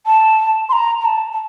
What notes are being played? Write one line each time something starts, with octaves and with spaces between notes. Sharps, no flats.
A5
C6
A#5
A#5
A5
A5